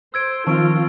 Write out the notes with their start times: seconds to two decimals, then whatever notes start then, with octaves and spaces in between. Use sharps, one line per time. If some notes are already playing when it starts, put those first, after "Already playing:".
0.14 C5 E6 G#6 D7
0.47 D#3 F3 C4 F4 A5 C#6 D7